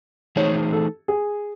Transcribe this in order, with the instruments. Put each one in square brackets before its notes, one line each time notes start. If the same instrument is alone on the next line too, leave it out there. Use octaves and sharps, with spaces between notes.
[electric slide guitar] E3 A3 D#4 G#4 C5 [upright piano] C#5
[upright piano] A4
G#4